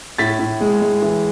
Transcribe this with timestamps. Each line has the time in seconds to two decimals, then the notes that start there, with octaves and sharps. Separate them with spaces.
0.18 A2 A6 B6
0.39 A2
0.61 G#3
0.81 G#3
1.02 E3